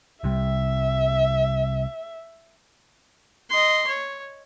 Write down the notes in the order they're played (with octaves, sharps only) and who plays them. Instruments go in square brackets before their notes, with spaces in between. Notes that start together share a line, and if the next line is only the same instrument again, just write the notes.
[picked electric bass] C2 C3 G3 [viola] E5
[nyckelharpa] D#5 C6
C#5